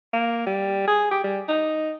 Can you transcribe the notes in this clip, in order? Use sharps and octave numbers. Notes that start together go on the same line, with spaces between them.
A#3
G3
G#4
G4
G3
D#4